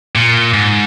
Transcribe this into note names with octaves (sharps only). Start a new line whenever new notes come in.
A#2
G#2